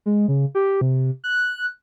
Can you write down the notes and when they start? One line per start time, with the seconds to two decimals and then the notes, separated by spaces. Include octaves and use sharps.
0.06 G#3
0.28 C#3
0.55 G4
0.81 C3
1.24 F#6